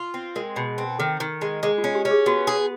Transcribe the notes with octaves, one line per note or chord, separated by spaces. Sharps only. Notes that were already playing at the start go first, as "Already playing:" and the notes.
Already playing: F4
C4
G#3 A#4
B2
C4
D#3 A4
D#3
G#3
G#3 G#4
F4
C#4
G4
C#4
G#4
B3 F#4
G#4